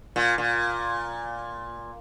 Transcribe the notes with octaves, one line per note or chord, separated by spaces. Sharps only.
A#2
A#2